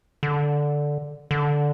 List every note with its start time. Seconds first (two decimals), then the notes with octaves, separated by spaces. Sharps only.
0.23 D3
1.31 D3